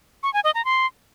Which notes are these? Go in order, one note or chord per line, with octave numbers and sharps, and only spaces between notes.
C#6
G#5
D#5
A#5
C6